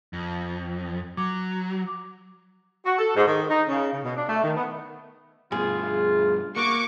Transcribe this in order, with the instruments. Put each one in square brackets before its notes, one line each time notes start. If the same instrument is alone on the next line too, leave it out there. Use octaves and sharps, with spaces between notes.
[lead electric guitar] F2
[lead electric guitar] F#3 [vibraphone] D6
[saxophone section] F#4
A4
G#2
D#3
D#4
C#3
C#3
B2
D4
A3
D#3
B3
[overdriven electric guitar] G2 B2 [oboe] F4 [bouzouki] G#4
[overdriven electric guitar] A#3 [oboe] F#4 [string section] C#6 D6